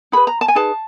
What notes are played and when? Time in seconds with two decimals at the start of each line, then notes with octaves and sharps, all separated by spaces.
0.12 D#4 G#4 B4 B5
0.27 A#5
0.41 A5
0.48 G#5
0.55 D#4 G#4 B4 A5